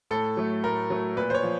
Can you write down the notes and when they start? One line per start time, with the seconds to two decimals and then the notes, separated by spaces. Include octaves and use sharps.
0.11 A2 A4
0.37 F#3 A3
0.64 A2 A#4
0.90 F#3 A3
1.16 A#2 B4
1.30 C5
1.34 C#5
1.43 F3